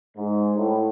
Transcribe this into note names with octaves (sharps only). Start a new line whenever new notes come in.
G#2
A2